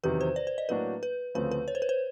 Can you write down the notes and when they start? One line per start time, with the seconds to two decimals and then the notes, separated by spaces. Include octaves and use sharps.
0.04 E2 C3 D#3 F#3 B4
0.21 C5
0.36 D5
0.47 C5
0.58 D#5
0.69 A2 F#3 A#3 D4 F#4 B4
1.03 B4
1.35 D2 C#3 F3 A3 C4 B4
1.51 B4
1.68 C#5
1.75 C5
1.82 B4
1.89 C5